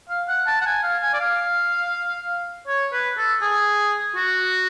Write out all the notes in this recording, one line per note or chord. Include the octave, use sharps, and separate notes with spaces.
F5
F#5
A5
F#5
G#5
F5
G#5
D5
F5
C#5
B4
A4
G#4
F#4